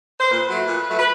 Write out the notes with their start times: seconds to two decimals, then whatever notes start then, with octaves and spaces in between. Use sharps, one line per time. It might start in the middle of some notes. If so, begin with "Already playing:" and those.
0.19 C5
0.31 A#2 B4
0.49 F#3 A3
0.67 A#2
0.87 F#3 A3
0.98 B4